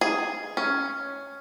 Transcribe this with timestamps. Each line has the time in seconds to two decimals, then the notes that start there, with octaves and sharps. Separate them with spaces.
0.01 G#4
0.57 C#4